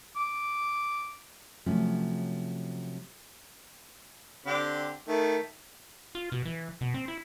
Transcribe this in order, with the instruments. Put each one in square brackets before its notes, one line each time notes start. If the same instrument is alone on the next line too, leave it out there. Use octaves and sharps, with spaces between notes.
[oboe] D6
[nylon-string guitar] C3 F3 F#3 A3 C#4
[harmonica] D3 C4 G4
D#3 A3
[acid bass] F4
B2
E3
B2
C4
E4